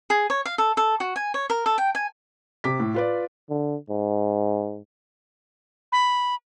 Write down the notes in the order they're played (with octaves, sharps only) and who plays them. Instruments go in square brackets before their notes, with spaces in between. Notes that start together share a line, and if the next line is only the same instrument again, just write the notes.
[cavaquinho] G#4
C#5
F5
A4
A4
F#4
G#5
C#5
A#4
A4
G5
G#5
[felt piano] C3 D6 B6
A2
F4 B4 D5
[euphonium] D3
G#2
[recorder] B5